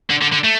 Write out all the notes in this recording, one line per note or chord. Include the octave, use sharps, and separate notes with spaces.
D3
D3
D3
A3